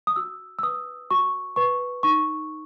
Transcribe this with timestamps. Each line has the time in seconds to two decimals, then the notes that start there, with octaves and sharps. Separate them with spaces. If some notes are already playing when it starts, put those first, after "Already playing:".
0.07 D#6
0.16 F#4 E6
0.59 E6
0.63 B4 D#6
1.11 F#4 C#6
1.56 B4 C#6
2.03 D#4 C#6